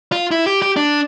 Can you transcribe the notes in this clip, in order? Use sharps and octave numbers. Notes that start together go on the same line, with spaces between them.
F4
E4
G4
G4
D4